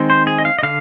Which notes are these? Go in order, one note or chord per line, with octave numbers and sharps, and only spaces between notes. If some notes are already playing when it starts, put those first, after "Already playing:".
Already playing: D#3 G#3 C4
C5
G#4
D#5
F5
D#5
D3 F5